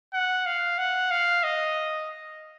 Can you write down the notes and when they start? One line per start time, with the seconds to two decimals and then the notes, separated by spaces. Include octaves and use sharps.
0.13 F#5
0.46 F5
0.78 F#5
1.11 F5
1.43 D#5